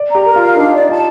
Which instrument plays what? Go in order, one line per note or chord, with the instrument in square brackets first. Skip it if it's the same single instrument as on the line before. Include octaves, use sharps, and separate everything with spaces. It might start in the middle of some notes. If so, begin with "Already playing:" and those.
Already playing: [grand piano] D5
[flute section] A#5
[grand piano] G4
[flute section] A#4
[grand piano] F4
[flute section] F5
[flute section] D4 [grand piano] D#4
[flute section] D5
[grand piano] F4 [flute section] A5